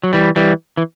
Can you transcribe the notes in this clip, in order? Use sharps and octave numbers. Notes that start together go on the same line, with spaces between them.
F#3
E3 G3
E3 G3
E3